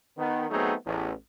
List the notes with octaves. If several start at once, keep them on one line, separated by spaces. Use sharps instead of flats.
D#3 B3
F#3 A3 B3 C4 D#4 G#4
A1 E2